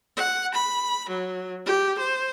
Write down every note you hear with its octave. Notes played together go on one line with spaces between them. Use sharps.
F#5
B5
F#3
G4
C5